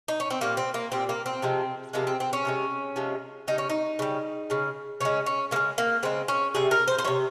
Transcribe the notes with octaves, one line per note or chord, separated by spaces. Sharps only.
D#4
C#4
C4
A#2 G3 A#3
C4
A#3
A#2 G3 C4
A#3
C4
C3 F3 G#3
C3 F3 G#3 A#3
C4
C4
C#4
C3 F3 G#3
C3 F3 G#3
C#3 G3 D#4
C#4
D#4
C#3 G3
C#3 G#3
C#3 G#3 C#4
C#4
C#3 G#3 A#3
A#3
C#3 G#3 C4
C#4
C3 G3 G#4
A#4
C5
C5
C3 G3 C#5